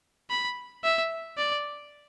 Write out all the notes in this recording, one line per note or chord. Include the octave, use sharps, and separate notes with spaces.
B5
E5
D5